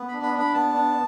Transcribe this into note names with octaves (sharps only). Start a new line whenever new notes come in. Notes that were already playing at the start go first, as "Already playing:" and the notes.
Already playing: B3
D4 B5
B5
D4
B5
B3 A5
D4